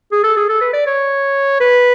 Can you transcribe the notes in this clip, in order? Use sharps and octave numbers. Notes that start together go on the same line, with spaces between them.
G#4
A4
G#4
A4
B4
D5
C#5
B4